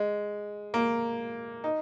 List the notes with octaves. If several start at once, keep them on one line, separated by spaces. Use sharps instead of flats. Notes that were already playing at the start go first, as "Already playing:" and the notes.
Already playing: G#3
A#3
D#4